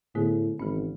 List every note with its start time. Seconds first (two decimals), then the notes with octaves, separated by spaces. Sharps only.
0.15 A2 D3 B3 G#4
0.60 G#1 E3 C#4